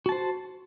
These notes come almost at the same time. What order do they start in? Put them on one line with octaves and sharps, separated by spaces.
F#4 A5 C5